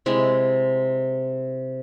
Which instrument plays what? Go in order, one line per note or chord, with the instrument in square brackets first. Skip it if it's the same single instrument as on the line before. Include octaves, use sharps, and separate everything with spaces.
[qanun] C3 G#3 E4